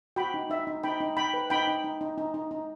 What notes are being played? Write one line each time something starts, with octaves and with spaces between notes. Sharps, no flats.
F#4 G5 B5
D#4
D#4 E5
D#4
D#4 G5 B5
D#4
D#4 G5 B5
B4
D#4 G5 B5
D#4
D#4
D#4
D#4
D#4
D#4